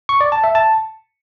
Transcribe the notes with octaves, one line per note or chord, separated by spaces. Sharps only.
C#6
D5
A5
E5
A5